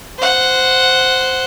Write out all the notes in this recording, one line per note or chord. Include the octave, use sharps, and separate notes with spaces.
C5 F#5